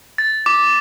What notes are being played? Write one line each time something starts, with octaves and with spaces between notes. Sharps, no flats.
A6
D6